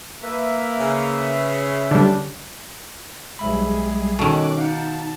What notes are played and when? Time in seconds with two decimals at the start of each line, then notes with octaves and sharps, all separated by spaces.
0.23 A#3 B4 E5
0.80 C#3
1.91 D3 G3 D4
3.39 B1 G3 G#3 G#4 E5 B5
4.19 B2 D#3 C#4 A4 C#5 D6 F#6
4.58 D#4 F5 F#5 A5